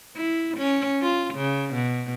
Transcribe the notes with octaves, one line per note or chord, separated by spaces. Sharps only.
E4
C#4
F4
C#3
B2